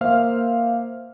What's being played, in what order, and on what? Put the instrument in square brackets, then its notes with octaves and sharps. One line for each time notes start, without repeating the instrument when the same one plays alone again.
[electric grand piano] A#3 C5 E5 F5 F6